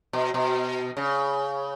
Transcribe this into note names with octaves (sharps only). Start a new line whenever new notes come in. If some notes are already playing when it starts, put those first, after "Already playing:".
B2
B2
C#3